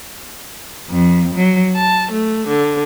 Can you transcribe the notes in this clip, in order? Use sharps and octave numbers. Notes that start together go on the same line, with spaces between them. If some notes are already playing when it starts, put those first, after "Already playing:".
F2
F#3
A5
A3
D3